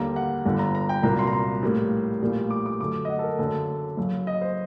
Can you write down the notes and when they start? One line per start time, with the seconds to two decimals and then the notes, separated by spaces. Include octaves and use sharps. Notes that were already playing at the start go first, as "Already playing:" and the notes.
Already playing: D#2 D3 G3 A#3 A#5
0.16 F#5
0.46 G1 G2 D3
0.59 A#5
0.75 A#5
0.89 G5
1.03 C2 A#2 F#3 A#3 A#5
1.19 C6
1.27 A#5
1.33 C6
1.62 A#1 A2 G3 A#3
2.22 A#1 A2 G3 A#3
2.50 D6
2.66 D6
2.80 F#2 D3 A3 D6
3.05 D#5
3.09 F#5
3.19 A4
3.24 A#4
3.39 F#1 F#2 D3 A3 A4
3.97 F#1 F#2 F#3
4.27 D#5
4.41 C5